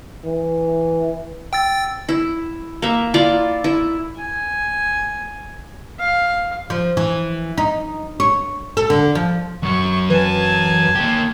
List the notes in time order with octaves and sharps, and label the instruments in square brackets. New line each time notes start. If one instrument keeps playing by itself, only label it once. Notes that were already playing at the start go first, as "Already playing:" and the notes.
[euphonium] E3
[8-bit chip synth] G5 E6 A6
[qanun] E4
A#3 E5
E4 F4 D5
E4
[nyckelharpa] G#5
F5
[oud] F3
E3
D#4
C#5
A4
D3
F3
[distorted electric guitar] F#2 F#3 [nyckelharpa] C#6
[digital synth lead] E3 [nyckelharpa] G#5 A5
[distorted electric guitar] A#3 G4